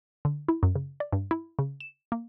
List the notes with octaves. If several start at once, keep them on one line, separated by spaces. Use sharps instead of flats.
D3
E4
F#2
C#3
D5
G2
E4
C#3
E7
A#3